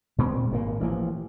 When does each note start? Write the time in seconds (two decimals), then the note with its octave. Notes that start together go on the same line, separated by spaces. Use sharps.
0.18 A#2 G#3 C4
0.51 G#1 A#2 A#3
0.80 A1 E3 F3